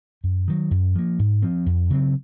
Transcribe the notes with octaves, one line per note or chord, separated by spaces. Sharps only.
F#2
D#3 F#3
F#2
F3 A#3
G#2
F3 C4
F2
C#3 F#3 C4